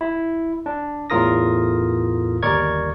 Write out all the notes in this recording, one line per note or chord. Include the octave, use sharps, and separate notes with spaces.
E4
D4
E2 A2 F4 A#4 D#6 A#6
G1 D#2 A#4 D5 C#6 G#6